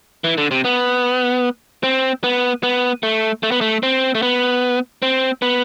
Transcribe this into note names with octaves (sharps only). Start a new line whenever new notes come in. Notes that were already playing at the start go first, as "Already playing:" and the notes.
E3
D3
C3
B3
C4
B3
B3
A3
A3
B3
A3
C4
A3
B3
C4
B3